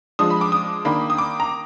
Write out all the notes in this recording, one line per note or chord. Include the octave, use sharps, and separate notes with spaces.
F3 G#3 D4 D#6
B5
D6
D#6
D#3 A#3 D4 B5
D#6
D6
A#5